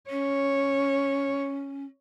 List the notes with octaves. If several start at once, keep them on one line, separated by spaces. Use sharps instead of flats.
C#4 C#5